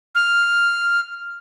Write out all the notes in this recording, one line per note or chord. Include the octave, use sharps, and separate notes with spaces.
F6